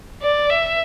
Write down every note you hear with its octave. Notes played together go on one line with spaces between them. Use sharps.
D5
E5